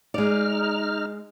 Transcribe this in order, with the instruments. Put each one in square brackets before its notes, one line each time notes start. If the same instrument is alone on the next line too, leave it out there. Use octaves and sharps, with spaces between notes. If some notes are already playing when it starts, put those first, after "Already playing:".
[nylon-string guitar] G#3 D5 [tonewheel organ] D#4 F6